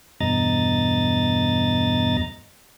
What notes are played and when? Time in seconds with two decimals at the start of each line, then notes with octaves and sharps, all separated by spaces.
0.21 E2 G2 B2 D#5 A#5 A6